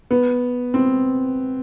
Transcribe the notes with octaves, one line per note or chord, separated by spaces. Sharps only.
B3
C4